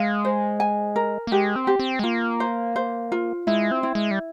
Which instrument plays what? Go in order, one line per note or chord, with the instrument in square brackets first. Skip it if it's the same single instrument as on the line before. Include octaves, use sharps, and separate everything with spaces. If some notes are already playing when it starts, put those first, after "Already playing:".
Already playing: [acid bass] G#3 [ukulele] F5
[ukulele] C5
G#5
A#4
[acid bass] A#3
[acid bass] G#3 [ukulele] G4
[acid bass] C4
[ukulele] G4
[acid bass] C4
G#3
[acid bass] A#3 [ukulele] F4
[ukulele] C5
C5
F4
[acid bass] G#3 [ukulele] E4
[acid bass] C4
[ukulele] E4
[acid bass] G#3
G3